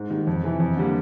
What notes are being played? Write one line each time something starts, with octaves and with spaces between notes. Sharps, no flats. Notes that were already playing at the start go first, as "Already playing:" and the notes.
Already playing: G#2
D#3 G3
F2
C3 E3
F2
D3 G3 A#3